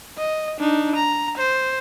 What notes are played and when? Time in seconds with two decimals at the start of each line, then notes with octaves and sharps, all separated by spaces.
0.18 D#5
0.59 D4 D#4
0.96 A#5
1.38 C5